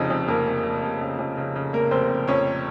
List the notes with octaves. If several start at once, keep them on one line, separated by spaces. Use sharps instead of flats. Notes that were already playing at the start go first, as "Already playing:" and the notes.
Already playing: F1 F2 C#3 D#4 D#5
F2
F2 A#3 A#4
F1
F1
F1
C#3
F2
C#3
C#3
F1 A#3 A#4
F1 C4 C5
F1
F2 C#4 C#5